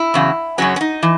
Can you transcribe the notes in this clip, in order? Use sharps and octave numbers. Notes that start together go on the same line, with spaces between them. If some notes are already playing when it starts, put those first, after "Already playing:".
Already playing: E4
E2 C#3 F#3
F#2 C#3 F#3 C#4
C#4
D#4
E3